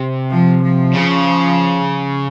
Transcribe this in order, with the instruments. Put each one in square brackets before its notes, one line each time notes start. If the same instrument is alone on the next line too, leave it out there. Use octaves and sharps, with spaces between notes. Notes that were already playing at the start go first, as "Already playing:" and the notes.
Already playing: [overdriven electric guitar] C3
[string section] F3
F3
[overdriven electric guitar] C#3